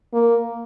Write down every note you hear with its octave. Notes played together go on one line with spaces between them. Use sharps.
A#3